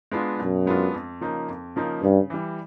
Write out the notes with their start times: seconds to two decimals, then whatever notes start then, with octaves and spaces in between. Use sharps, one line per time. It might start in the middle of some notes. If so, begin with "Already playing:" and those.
0.11 G#3 B3 D4 F4
0.39 F#2 B2
0.66 G#3 B3 D4 F4
0.94 F2
1.21 C#3 F3 A#3 D#4
1.48 F2
1.76 C#3 F3 A#3 D#4
2.03 G2 C#3
2.30 E3 G3